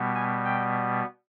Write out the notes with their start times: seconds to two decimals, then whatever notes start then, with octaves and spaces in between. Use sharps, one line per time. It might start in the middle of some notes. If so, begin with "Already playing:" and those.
Already playing: B2 G3 B3
0.15 G#5
0.45 G5